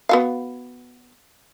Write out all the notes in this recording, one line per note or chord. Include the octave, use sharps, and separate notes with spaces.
B3 F#4 F5